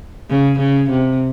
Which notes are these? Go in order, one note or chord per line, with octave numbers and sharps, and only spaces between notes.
C#3
C#3
C3